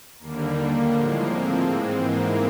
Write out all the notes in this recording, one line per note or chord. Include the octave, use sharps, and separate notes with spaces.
D#2 D3 G3 A#3
A2 F3 G#3 A#3
C4
G#2 E3 G#3
A#3